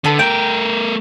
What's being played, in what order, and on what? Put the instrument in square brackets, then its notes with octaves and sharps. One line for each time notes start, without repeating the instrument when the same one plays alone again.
[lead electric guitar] D3 [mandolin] B3 A4 B4
[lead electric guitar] A3 A#4 [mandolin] G5